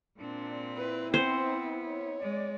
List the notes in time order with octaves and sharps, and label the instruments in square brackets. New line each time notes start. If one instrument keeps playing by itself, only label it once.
[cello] A#2 C4 [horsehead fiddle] D4
[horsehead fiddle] E4 [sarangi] B4
[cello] B3 [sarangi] C4 [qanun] C5
[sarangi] C#5
[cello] G#3 [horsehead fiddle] D5